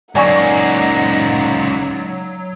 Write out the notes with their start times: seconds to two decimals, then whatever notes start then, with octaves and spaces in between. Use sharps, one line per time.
0.15 C#2 F#3 A#3 D#4 D5 F#5 G#5 C#6